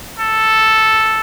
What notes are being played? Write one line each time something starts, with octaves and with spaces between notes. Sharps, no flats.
A4